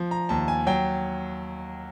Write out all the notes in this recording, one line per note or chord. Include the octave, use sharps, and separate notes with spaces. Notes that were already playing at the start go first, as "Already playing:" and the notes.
Already playing: F3
A#5
D#2 A5
G#5
F#3 G5